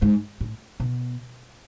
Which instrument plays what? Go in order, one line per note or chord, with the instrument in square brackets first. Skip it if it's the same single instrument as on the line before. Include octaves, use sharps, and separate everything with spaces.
[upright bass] G#2
A2
B2